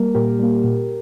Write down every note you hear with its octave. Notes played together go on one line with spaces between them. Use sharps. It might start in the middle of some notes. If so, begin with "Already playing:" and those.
Already playing: G3 A#3 A#4
A#2 G4 A#4
G3 A#3
A#2